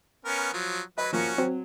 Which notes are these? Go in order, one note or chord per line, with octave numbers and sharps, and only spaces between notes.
B3 C#4 A#4
F3 F#3
F#3 B4 D#5
F3 A#3 C#4 F#4
F#3 C4